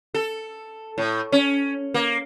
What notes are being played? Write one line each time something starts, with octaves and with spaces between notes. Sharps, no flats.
A4
A2
C#4
A#3